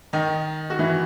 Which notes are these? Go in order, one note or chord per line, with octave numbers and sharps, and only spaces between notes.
D#3 D#4
F#4
E3 E4